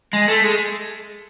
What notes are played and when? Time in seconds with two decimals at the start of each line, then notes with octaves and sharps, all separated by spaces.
0.13 G#3
0.28 A3
0.44 G#3